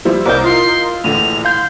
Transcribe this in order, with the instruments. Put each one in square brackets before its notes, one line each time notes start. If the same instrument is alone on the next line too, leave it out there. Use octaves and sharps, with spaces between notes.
[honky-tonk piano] F3 E4 C5 [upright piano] G3
[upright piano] C2 C4 G6 [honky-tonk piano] A#4 D#5 [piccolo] D6
[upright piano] E4 F4 [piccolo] C6
[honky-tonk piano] A#1 D#7 [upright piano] A2 D3 E3 [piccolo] F7
[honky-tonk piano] F5 G6 G#6 [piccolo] C6